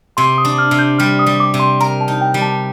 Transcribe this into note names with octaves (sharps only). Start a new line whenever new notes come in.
C3 C6
D#6
D4
F6
C3
G6
G3 F6
D#6
G3
D6
C3
C6
A#4 A#5
A5
D#4
G5
G3
A5